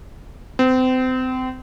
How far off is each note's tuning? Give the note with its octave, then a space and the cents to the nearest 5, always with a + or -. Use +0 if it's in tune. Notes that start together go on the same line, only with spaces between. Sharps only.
C4 -30